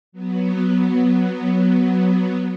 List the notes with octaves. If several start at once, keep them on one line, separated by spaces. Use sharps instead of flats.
F#3 B3